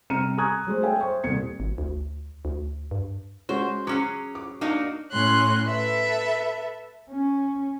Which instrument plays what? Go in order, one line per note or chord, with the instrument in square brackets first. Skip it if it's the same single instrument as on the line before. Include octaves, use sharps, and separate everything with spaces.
[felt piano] C3 G3 A#5 F6 C#7 D#7
G#5 A#5 C#6 D#6 F#6 G#6
F#3 G#3 A3 C5
G#4 A4 C#5 E5 G5 G#5
C5 C#6
D#1 C2 G#6 C#7
[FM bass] G#1
D2
D2
G2
[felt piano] G#3 C#4 F#4 [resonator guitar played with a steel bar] C5
[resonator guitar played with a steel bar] F#3 C#4 G#4 [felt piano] D6
[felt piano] D6
[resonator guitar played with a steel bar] A#3 D#4 F#4 [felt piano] D4
[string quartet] A2 C#4 C6 F#6
A4 B4 E5
[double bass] C#4